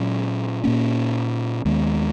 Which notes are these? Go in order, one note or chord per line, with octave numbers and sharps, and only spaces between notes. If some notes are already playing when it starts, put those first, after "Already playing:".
Already playing: A#2 F#3 C#4
A#2 A#3 C#4
D#2 D#3 G#3 B3